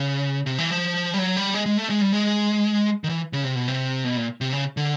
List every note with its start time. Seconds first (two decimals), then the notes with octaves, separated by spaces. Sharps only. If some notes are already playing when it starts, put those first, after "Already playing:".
Already playing: C#3
0.46 C3
0.58 E3
0.70 F3
1.14 G3
1.18 F#3
1.37 G3
1.54 G#3
1.66 G#3
1.78 A3
1.90 G#3
2.01 G3
2.13 G#3
3.04 D#3
3.09 E3
3.33 C#3
3.44 C3
3.55 B2
3.68 C3
4.05 B2
4.17 A#2
4.41 C3
4.53 C#3
4.77 D3